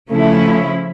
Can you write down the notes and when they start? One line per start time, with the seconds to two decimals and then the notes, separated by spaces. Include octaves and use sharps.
0.10 C#3 F3 A3 C#4 E4